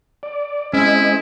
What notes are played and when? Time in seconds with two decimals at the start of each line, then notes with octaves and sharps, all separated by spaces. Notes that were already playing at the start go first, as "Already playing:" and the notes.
0.23 D5
0.73 G#3 C4 C#4 E4 D#5